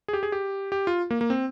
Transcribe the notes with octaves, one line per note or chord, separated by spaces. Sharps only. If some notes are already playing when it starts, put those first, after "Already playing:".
G#4
G4
G#4
G4
G4
F4
A#3
A#3
C4